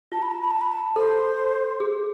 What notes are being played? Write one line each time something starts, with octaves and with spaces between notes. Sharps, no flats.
F4 A5
B5
A5
B5
A5
B5
A5
A4 C5
G#4